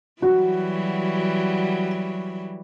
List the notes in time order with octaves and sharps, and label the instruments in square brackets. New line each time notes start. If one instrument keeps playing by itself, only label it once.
[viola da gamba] E3 F#3 G3 [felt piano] F#4